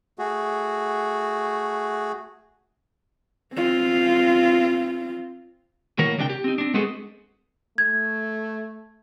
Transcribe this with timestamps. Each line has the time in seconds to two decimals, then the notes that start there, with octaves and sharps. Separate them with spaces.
0.19 A3 F#4 G#4
3.54 C4 F4
5.98 A2 D#3 A#3 F#4 A#4 C#5
6.17 C#2 C3 D4 G4 G5
6.30 G4
6.44 C4 D#4
6.58 C4 D4
6.74 G#3 B3 C4 F#4 G#4 A4
7.78 A3 G#6